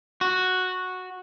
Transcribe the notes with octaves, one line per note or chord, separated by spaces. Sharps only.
F#4